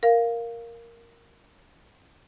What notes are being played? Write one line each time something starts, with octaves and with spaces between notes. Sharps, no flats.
A#4 F5